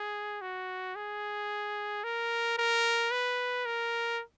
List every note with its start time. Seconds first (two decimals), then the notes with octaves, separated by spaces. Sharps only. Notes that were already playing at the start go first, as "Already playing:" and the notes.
Already playing: G#4
0.42 F#4
0.96 G#4
2.04 A#4
2.58 A#4
3.11 B4
3.65 A#4